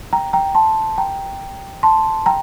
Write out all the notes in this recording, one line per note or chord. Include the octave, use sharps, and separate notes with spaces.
G5 A#5
G5 A#5
A5 C6
G5 A#5
A5 C6
G5 A#5